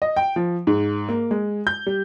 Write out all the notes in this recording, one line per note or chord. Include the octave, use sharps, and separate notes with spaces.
D#5
G5
F3
G#2
A#3
G#3
G6
G3